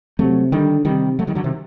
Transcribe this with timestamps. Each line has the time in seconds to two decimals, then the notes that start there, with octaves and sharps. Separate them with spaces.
0.19 C3 F#3 A3
0.52 D3 D#3 G3
0.85 C3 D#3 G3
1.19 F#3 A3
1.27 D#3 G3
1.35 D3 F#3
1.44 C3 D#3